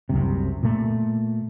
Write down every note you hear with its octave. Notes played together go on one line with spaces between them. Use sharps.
F#1 C2 C3
A#2 A3